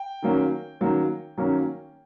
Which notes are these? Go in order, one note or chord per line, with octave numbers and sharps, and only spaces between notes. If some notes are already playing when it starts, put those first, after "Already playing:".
Already playing: G5
D#3 F#3 A#3 C#4
D#3 F#3 A#3 C#4
D#3 F#3 A#3 C#4